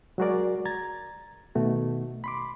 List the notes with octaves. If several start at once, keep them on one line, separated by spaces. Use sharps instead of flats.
F#3 G#3 F#4 G#4 A#4 D5
A#5 G#6 A6
B2 D#3 A3 F#4
B5 C6 D6